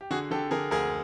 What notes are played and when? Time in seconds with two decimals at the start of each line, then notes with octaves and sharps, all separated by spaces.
0.01 G4
0.11 D3 F#4 G#4
0.31 D3 G4 A4
0.51 D3 G#4 A#4
0.71 D2 G#4 A#4